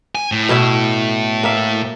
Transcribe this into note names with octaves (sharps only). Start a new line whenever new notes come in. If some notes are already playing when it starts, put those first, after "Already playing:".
G#5
A2
B2 E4 E5
A#3 E5